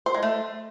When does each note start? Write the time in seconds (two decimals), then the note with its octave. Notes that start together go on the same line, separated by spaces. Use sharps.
0.06 C5
0.14 G#3
0.23 A3